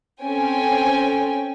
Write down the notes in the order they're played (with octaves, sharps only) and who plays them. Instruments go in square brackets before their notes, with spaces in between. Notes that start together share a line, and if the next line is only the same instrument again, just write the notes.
[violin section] C4 C#4 A4 G5 G#5